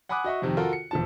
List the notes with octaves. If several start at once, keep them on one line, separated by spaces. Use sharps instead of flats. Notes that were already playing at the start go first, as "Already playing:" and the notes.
F#5 G#5 B5 D6 D#6 F#6
F#4 D#5 E5 C#6
F2 C3 D#3
F4 F#4 A4 A#4
C#7
E1 F3 A5